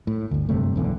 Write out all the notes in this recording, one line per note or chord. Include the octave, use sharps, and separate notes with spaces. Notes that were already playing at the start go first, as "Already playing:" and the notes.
A2
G1 D2
F#1 G2 C3 A3
B1 E2 D3